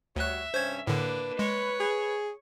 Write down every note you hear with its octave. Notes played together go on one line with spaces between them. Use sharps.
D2 G3 F#4 C#5 E5 F#6
G2 C3 C#4 C5 G#6
A2 D3 A#3 D4 B4
G#3 C#5
G#4